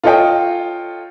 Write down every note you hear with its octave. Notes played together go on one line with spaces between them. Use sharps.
F4 A4 C#5 D#5 G5